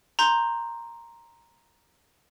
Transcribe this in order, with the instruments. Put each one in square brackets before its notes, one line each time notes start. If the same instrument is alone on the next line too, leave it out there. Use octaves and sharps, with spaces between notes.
[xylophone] A#5 C6 G6